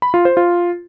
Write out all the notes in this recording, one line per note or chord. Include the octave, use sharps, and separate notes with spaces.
B5
F4
C5
F4